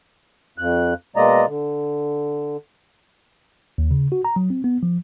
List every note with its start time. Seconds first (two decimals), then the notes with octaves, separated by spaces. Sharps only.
0.58 F2 F#6
1.16 B2 G#3 A#3 D5 D#5 A#5
1.47 D3
3.78 D#2
3.91 C#3
4.12 F#4
4.25 A#5
4.36 F#3
4.50 C4
4.64 B3
4.83 F3